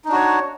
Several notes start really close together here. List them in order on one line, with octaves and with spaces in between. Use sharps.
D#4 D4 F#4 C#5